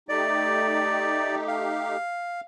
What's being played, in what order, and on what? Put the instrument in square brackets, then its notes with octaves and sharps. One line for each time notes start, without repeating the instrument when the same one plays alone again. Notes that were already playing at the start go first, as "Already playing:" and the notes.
[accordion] A3 D#4 G4 [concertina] D5
[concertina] F5